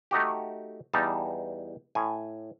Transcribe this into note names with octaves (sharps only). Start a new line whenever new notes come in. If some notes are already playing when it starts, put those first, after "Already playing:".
A3 D#4 F#4 G4
E2 G3 D#4 A5
A2 G#5